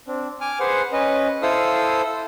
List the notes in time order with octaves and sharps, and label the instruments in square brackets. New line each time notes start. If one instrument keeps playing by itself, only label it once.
[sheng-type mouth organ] C4 D4
G#5 D6 F6
G#4 B4 C5 F#5
C#4 B4 D#5
E4 A4 C5 F5 D#6 E6